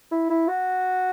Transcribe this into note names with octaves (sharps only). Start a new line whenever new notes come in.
E4
E4
F#4